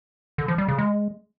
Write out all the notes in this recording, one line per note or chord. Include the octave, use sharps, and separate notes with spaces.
D3
F3
G3
C#3
G#3